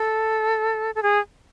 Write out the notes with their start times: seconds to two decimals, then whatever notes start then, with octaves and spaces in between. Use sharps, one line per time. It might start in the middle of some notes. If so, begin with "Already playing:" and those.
Already playing: A4
0.95 A4
1.03 G#4